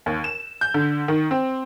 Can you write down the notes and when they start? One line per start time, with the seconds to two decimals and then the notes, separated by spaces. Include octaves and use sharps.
0.06 D#2
0.24 E7
0.61 G6
0.74 D3
1.08 D#3
1.31 C4